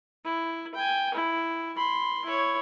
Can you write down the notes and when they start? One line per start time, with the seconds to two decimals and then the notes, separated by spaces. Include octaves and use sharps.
0.25 E4
0.75 G5 G#5
1.14 E4
1.77 B5 C6
2.25 E4 C#5